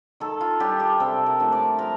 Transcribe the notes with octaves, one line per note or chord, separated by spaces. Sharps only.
D#3 A4
F4
G3 D4 G4
G4
C3 A4
A#4
F3 A3 D4
D5
F3 A#4